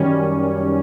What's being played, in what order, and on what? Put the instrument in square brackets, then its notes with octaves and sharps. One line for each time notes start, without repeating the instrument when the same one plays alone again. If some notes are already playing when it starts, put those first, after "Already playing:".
Already playing: [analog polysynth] F#2 D#3 G3 C#4